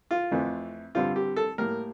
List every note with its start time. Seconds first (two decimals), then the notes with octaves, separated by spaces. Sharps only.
0.11 F4
0.31 F2 E3 A3 C4
0.95 G2 D3 G3 C4 F4
1.16 G4
1.36 A4
1.58 A2 G3 A#3 A#4